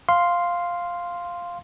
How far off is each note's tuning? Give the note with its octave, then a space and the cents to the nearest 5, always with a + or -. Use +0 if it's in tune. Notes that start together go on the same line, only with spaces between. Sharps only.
F5 +0 C6 +0